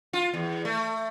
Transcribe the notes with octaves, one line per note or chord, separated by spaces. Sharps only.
F4
E2
A3